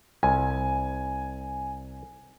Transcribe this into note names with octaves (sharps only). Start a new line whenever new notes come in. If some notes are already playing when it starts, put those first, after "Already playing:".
C2 G#5